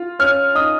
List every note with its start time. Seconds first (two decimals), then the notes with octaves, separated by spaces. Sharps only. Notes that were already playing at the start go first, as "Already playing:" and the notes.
Already playing: F4
0.19 C#4 F6
0.55 D#4 D#6